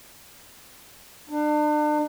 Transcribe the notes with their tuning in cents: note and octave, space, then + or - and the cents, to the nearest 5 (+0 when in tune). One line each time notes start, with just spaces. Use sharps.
D4 +40